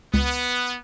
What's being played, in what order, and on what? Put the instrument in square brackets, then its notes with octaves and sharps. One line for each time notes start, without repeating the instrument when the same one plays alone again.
[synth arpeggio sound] C#2 [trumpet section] B3